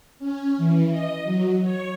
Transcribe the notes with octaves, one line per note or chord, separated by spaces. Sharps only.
C#4
E3
D#5
F#3
C#5